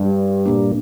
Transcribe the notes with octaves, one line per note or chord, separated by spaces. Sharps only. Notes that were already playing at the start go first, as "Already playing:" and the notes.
Already playing: G2
A#2 G3 A#3 D4